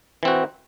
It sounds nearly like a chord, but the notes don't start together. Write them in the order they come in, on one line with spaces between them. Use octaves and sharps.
E3 C4 F#4